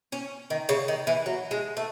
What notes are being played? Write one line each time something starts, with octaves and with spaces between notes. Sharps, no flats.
C#4
D#3
C#3
D#3
E3
F#3
G#3
A3